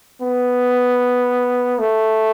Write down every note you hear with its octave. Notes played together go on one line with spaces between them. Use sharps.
B3
A3